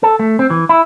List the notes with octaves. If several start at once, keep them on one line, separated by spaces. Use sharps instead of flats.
A4
A3
C4
E3
E4